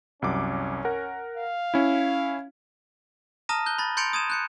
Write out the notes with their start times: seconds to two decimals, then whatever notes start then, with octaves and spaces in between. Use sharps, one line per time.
0.22 C2 F#2 C#4 D6
0.85 A#4 F#5
1.37 F5
1.74 C#4 E4
3.49 A5 A#5 D#6 F6 A#6 D#7
3.66 F#6 G6 G7
3.79 B5 A6
3.97 C6 G6 A6 C#7 D7 F7
4.13 D#6 G#6 D#7 E7
4.30 F#6 G6 C#7